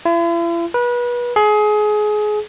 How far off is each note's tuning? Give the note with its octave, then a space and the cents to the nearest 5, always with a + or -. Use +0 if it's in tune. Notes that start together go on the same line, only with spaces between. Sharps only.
E4 +45
B4 -30
G#4 +25